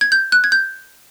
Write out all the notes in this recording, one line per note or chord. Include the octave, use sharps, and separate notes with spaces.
G#6
G6
F#6
G#6
G6